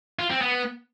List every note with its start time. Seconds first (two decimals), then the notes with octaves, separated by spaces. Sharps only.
0.19 F4
0.30 C4
0.41 B3